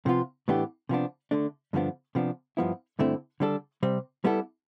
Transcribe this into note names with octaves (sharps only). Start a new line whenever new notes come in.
C3 F3 B3 F4
A2 E3 B3 D4 G4
C3 F3 B3 D4
D3 A3 D4
G2 D3 F3 B3 D4
C3 F3 B3 D4
G2 F3 B3 E4
G2 D3 A3 C4 E4
D3 G3 D4 A4
C3 G3 C4
G3 B3 E4 A4